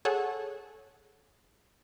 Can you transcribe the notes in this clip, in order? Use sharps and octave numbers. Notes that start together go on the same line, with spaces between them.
G#4 A4 C#5 F#5 G#5